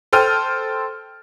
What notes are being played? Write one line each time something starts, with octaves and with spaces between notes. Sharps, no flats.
A4 C5 G5 F6 D#7